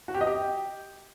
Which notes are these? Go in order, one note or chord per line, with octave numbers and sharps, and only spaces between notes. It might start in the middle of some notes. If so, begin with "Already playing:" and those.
F#4
G4
D#5
G4